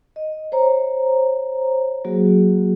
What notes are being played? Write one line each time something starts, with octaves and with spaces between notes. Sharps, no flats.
D#5
C5 C#5 A#5
F#3 A#3 F#4 G#4